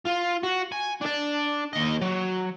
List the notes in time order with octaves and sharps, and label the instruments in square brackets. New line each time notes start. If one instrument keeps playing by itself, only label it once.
[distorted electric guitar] F4
F#4
G#5
D4 D5
D#2 D#5
F#3